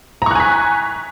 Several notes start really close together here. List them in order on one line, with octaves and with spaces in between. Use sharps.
A#5 C#6 F#6 G#5 B6